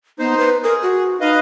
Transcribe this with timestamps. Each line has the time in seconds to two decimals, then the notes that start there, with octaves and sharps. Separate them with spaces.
0.19 B3 D#4 C5
0.37 B4
0.63 G#4 A#4
0.82 F#4
1.21 D#4 B4 D#5 F5